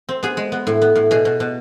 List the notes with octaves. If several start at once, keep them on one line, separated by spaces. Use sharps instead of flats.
C4
B3 G#4
G#3
B3
A2
B3
A2
B2 G#4
B2
B2